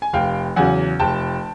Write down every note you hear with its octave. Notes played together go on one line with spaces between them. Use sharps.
G#5
F1 F5 G5
E2 C#3 F#3 F#5 G#5
F1 G5 A5